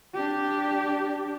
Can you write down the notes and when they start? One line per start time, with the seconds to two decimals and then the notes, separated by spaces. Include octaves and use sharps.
0.14 D4 G4